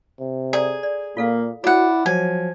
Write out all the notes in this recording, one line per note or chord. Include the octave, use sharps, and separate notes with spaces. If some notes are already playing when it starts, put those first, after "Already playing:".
C3
G#4 A4 D5 A#5
D5
A#2 A#3 F4 A4 F5
E4 F#4 C#5 D5 F#5
F3 F#3 G#5